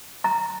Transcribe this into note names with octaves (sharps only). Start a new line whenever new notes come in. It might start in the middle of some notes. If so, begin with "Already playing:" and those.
A#5